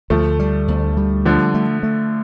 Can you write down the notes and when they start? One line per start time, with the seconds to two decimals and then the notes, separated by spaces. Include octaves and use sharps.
0.10 D2 F3 A3
0.39 G3
0.68 D2
0.97 G3
1.25 D3 F3 A3
1.54 A3
1.83 A3